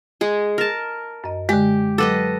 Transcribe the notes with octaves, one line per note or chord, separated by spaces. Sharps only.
G#3 G#4
A#4 A5
F#2 D#5
D3 G#3 G4
F#3 A4 B4 D#5 D6